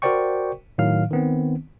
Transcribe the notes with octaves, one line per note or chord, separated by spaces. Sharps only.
F#4 A#4 C5 D5 G5 C#6
A2 D#3 F#3 F5 F6
D#3 B3 C4